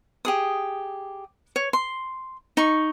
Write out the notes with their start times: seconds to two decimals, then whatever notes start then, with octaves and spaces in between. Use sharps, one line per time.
0.25 G4 G#4 D#6
1.56 C#5
1.73 C6
2.57 D#4 C#6